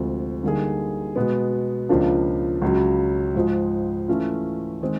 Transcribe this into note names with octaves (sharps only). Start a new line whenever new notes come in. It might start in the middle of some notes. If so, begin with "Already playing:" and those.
Already playing: D2 C3 F3 G#3 C4
D3 G3 A#3 D#4 G#4
B2 G#3 B3
C#2 C#3 F3 A#3 D4
C#2 C#3 F#3
G#2 F3 G#3
E3 A3 C#4 F4 A4
D#3 G#3 C4